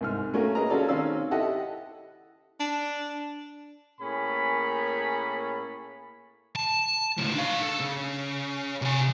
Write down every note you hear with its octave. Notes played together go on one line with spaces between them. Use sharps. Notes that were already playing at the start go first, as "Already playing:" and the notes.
C2 G#2 F6
A3 A#3 C#4 F#4 A#4
G#4 A#4 B4 D#5 A#5
C#4 F4 F#4 G#4 A4 D5
D#3 C4 C#4 F5 E6
E4 G4 A4 D#5 E5 F#5
D4
A2 A#3 C#4 G#4 B5
A5
C#2 A2
D4 F5
A4
C#3
C3 G#5